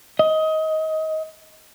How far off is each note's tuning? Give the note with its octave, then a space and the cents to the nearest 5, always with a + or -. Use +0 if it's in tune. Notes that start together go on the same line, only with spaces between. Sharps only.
D#5 +20